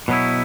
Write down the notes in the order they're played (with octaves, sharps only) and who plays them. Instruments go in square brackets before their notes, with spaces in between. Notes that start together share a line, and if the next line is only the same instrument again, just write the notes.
[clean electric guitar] B2 F#3 B3 E4